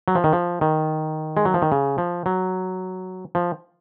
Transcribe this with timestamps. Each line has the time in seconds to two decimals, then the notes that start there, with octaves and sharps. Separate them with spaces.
0.08 F#3
0.15 F3
0.24 D#3
0.33 F3
0.61 D#3
1.37 G#3
1.45 F#3
1.54 F3
1.62 D#3
1.72 C#3
1.98 F3
2.26 F#3
3.35 F3